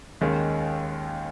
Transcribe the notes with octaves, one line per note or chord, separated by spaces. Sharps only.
D#2 D#3 G#3 C#4